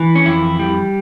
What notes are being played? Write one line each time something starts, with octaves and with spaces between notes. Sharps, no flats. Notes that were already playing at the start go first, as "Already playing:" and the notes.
Already playing: E3
C#4
F2 E4
G3